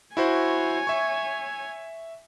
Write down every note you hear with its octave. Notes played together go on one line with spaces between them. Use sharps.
E4 F#4 C5 C#5 G#5
E5 C#6